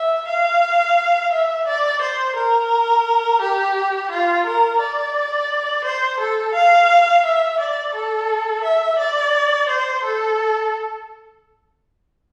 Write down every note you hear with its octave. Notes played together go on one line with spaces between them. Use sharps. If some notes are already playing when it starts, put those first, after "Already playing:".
Already playing: E5
F5
E5
D5
C5
A#4
G4
F4
A#4
D5
C5
A4
F5
E5
D5
A4
E5
D5
C5
A4